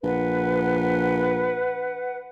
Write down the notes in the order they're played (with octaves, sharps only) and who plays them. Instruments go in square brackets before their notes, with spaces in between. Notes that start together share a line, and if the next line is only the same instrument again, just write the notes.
[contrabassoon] A#1 [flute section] B4 F#5